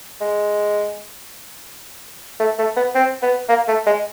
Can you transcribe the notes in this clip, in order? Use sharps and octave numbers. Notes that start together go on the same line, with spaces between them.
G#3
A3
A3
B3
C4
B3
A#3
A3
G#3